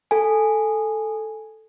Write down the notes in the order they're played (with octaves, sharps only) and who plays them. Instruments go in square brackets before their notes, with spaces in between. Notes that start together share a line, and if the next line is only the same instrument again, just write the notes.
[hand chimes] A4 G#5